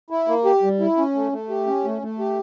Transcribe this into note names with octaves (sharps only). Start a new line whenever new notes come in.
E4
A#3
G4
G3
E4
C#4
A3
A3
G4
C#4
A3
A3
G4